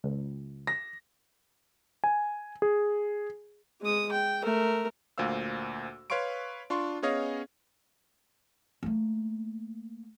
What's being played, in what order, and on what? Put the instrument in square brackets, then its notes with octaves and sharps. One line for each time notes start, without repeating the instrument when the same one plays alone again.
[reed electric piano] C#2
[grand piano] A#6
[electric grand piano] G#5
G#4
[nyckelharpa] G#3 D#6
G5
A3 A#4
[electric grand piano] D2 A#2 C5 F5 E6
B4 C#5 F5 C6 C#6 D7
D4 F4 C6 C#6
B3 C#4 G#4 C#5 D#5 F5
[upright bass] A3 A#3